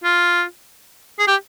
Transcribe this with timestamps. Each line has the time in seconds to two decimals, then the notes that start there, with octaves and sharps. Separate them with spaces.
0.04 F4
1.19 G#4
1.27 G4